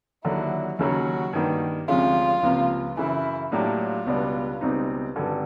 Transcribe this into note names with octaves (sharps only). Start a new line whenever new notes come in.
D#2 D3 F#3 E4
D#2 C#3 F#3 F#4
G2 D#3 G3 A#3
D2 C3 F3 G#3 C#4 F4
C#2 C3 F3 A#3
F#2 C#3 E3 E4
A2 F#3 A#3 D4 F4 G4
C#2 B2 G3 B3 D4
C#2 B2 G3 C4 D#4
G#1 G2 D3